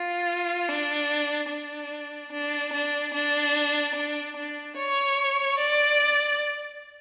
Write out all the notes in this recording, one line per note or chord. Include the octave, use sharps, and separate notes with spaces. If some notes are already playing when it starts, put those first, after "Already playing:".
Already playing: F4
D4
D4
D4
D4
D4
D4
D4
C#5
D5